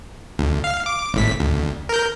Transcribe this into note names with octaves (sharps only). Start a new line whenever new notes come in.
D2
F5
D6
G#1 A2 B6
D2
A#4 G6